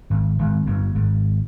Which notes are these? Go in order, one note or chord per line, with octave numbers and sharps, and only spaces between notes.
G#1 G#2
G#1 G#2
G1 G2
G#1 G#2